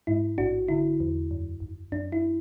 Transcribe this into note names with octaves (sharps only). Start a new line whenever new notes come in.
G#2 E4
A1 D4 F#4
D3 E4
E2
F#2
G#1
F#2 D4
E4